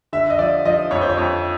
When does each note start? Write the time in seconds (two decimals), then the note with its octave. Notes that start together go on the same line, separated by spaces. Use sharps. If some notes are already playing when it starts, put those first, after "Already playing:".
0.13 D3 E5
0.30 D#5
0.39 F3 D5
0.65 F3 D#5
0.91 F2 C#5
1.01 C5
1.10 C#5
1.18 F2